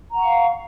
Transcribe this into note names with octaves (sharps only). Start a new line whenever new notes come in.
F5 F#5 A#5 C#6